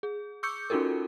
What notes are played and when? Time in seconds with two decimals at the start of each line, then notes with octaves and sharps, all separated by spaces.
0.03 G#4
0.43 C#6 D6 E6 G6 C#7
0.70 C#4 D#4 F4 F#4 A4 A#4